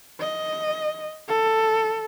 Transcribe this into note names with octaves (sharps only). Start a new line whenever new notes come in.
D#5
A4